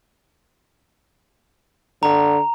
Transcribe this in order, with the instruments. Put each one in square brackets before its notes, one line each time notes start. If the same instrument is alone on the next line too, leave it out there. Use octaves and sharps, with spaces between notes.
[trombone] D3 [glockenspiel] A#5